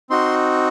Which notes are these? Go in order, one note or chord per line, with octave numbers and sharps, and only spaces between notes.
C4 D#4 F#4 C6